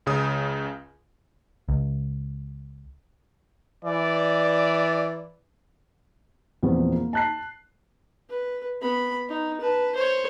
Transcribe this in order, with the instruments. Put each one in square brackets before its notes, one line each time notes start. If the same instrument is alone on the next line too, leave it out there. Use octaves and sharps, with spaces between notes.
[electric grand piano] C#2 C#3 D#6
[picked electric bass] C#2
[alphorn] E3 [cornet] D5
[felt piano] E2 A#2 F3 G3 B3 C4
A#3
A5 F#6 C7
[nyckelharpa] B4
B3 B5
D#4
B4 A5
C5 C#5